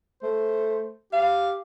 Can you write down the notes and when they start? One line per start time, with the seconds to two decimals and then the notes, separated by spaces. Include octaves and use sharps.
0.23 A3 C5
1.13 G4 F5